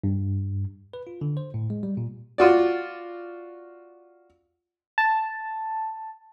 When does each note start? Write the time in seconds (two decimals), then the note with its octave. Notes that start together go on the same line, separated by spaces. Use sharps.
0.04 G2
0.93 B4
1.07 F4
1.21 D3
1.37 C5
1.54 A2
1.70 G#3
1.83 G3
1.97 A#2
2.38 F4 F#4 D5
4.98 A5